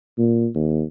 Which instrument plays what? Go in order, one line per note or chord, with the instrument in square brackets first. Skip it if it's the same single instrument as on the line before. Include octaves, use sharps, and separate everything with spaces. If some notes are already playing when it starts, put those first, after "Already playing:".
[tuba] A#2
D#2